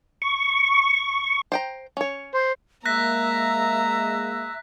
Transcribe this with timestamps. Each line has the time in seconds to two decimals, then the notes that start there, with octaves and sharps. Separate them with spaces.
0.22 C#6
1.52 C5 G5 A#5
1.97 C#4 C#5
2.34 C5
2.85 G#3 A#3 E5 A#5 E6 F#6 A#6 B6